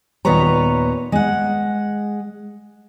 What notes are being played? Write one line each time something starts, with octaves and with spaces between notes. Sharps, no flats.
D#2 A#2 B3 B4 C#5 A#5
G#3 F#5